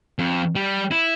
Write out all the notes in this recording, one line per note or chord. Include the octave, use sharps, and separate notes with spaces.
F2
G3
E4